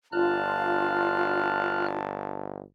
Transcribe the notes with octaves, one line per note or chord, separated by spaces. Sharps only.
G1 D4 F4 A5 F6 F#6